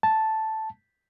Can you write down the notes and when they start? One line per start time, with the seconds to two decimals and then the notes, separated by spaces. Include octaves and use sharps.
0.03 A5